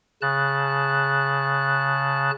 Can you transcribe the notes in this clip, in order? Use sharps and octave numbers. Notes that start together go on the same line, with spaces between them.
C#3 A5 F#6